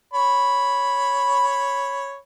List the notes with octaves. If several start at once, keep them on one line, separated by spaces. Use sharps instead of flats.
C#5 B5